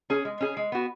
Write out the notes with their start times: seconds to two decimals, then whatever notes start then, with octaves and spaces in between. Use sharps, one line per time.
0.10 C#4 G#4
0.25 G#3
0.40 C#4 G#4
0.57 G#3
0.72 B3 F#4